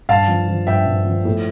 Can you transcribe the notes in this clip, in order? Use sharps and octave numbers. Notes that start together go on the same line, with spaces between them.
G2 F5 A5
F3
F3
G2 E5 G5
G2
F3
A2